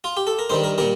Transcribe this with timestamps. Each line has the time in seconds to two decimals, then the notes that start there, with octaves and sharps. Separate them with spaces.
0.04 F4
0.17 G4
0.27 A4
0.39 A#4
0.50 G2 D#3 G3 C5
0.64 A#4
0.78 A#2 G3 A#4